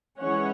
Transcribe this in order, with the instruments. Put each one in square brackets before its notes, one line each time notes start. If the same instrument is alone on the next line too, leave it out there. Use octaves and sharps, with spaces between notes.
[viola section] E3 G#3 C#4 C#5 F#5